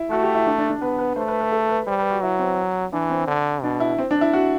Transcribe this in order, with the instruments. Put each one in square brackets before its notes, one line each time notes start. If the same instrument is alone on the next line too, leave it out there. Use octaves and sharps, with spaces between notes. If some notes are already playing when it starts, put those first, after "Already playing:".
Already playing: [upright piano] E4
[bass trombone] A3 [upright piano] F#4
[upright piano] G4
E4
D4
D4
D4
[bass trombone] B3 [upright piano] B4
[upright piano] B4
[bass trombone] A3 [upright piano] C5
[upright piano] B4
B4
A4
B4
[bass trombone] G3 [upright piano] C5
[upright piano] B4
F#4
[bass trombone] F#3 [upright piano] E4
[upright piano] C4
[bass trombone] E3 [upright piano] D4
[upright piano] C4
[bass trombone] D3
[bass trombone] B2 [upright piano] D4
[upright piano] E4
C4
D4
E4
F#4